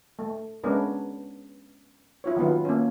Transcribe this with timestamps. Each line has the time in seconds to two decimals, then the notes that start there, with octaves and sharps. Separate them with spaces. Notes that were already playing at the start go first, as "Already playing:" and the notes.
0.19 A3
0.64 G#3 B3 C#4 D4 A#4
2.24 E4 F4 C#5
2.36 D#3 F#3 B3 F4
2.65 A#3 C#4